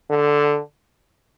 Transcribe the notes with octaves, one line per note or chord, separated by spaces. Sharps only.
D3